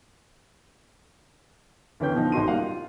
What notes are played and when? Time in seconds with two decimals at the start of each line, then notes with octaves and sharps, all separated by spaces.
2.00 D2 E3 B3 C#4 G5 G6
2.14 B2 D3 F3 D#4
2.32 A1 D#4 F#4 C6 D#7
2.48 G3 A#3 D#4 F5 F#5
2.59 F4